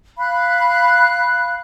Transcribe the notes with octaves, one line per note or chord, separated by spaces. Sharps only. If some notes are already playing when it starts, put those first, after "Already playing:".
F5 B5 F#6